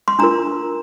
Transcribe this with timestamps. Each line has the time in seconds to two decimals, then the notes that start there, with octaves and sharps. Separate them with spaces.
0.08 C6
0.19 D4 F4 A#4 A#5